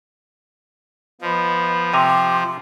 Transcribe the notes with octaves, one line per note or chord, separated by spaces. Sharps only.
F3 B3 D#5
C3 G4 G#5 A#5 C6